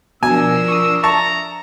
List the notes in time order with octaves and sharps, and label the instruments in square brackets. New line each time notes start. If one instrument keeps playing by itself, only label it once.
[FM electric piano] B2 [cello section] F3 D4 A#4 [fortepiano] G#5 [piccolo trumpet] E6
[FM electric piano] C#6 D#6
[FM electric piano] E5 [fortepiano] A5 C#6 [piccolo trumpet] A#5